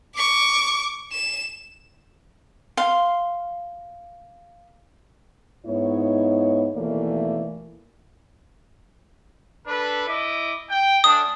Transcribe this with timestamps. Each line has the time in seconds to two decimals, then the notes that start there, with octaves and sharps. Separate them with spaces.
0.16 C#6 D6
1.12 E7
2.77 F5 C6
5.66 G#2 B3 D#4 E4 C#5
6.75 D#2 B2 E3 A3 A#3 D5
9.67 D4 A4 B4
10.07 E4 D#5 D6
10.69 G5
11.04 A3 C#4 D4 D#6